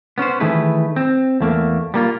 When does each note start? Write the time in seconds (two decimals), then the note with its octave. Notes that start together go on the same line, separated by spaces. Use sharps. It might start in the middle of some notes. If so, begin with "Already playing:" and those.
0.18 B3 C#4 B4 C5
0.40 D#3 E3 A3 E4 G#4 B4
0.96 C4
1.41 E2 A3 A#3
1.94 G3 A#3 F4